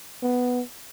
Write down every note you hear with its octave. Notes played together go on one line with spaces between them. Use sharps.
B3